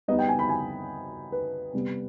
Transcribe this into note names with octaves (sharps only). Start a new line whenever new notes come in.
G3 B3 D#4 D#5
G5
G#5
B5
G#5
B4
C3 G3 B3